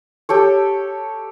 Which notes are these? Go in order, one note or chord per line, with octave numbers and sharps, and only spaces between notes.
G4 A4 C#5